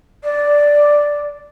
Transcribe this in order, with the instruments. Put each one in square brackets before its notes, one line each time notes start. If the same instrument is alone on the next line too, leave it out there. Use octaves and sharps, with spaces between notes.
[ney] D5